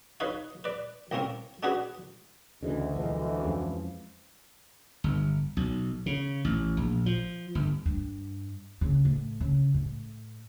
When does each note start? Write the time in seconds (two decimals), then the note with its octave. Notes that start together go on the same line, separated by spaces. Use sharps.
0.20 D#4 B4 C#5 F5
0.64 B4 D5
1.11 C2 A#3 C4 C#4 A#4
1.63 C#4 D4 F#4 G#4 B4
2.63 D2 C#3 E3 D#5
2.96 B1 E3 F3 G#3
3.43 F2 F3 G#3 C#4
5.04 G1
5.57 B1
6.06 C#3
6.45 A1
6.77 A#1
7.06 F3
7.55 G1
7.86 G2
8.81 C#3
9.05 A2
9.40 C#3
9.74 A2